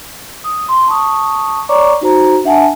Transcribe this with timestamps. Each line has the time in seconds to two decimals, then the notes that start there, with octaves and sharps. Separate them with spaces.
0.44 D#6
0.69 C6
0.88 A5 C#6 D#6
1.69 C#5 D5 A#5 C#6 D6
2.01 D#4 F#4 C5 A#5
2.44 D4 E5 F#5 G#5 A5